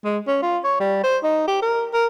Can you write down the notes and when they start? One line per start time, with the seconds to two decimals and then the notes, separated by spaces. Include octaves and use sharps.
0.04 G#3
0.27 C#4
0.42 F4
0.64 C#5
0.80 G3
1.03 C5
1.23 D#4
1.48 G4
1.62 A#4
1.93 A#4